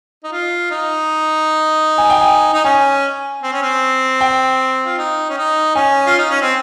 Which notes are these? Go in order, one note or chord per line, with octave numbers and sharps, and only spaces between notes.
D#4
F4
D#4
G#5
G5
G#5
D#4
C#4 G#5
C4
C#4
C4
G5
F4
D#4
C#4
D#4
C#4 G#5
F4
D#4
C#4
C4